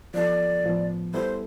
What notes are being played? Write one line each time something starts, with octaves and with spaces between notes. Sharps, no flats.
F3 B3 F4 A4 D5
A2 F3 B3
G3 B3 E4 A4 C5